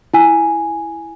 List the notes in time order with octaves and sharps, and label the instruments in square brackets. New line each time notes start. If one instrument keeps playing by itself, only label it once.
[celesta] E4 G#5